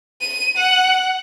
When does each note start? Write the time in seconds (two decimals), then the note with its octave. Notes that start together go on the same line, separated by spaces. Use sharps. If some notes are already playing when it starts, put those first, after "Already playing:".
0.21 D#7
0.57 F#5